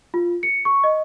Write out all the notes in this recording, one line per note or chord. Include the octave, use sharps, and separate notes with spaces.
F4
C#7
C#6
D#5